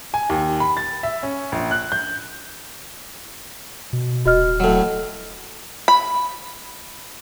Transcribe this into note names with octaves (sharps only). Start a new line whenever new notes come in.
G#5
D#2
B5
A6
E5
C#4
A#1
F#6
G6
B2
D#1 F#4 D#5 F6
A2 F#3
B5